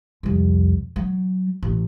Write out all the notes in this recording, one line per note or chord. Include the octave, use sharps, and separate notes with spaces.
C2 F2
F#3
A1